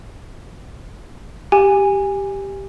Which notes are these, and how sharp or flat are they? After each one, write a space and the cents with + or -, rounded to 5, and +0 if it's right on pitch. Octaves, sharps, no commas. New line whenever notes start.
G4 +0 G#5 -20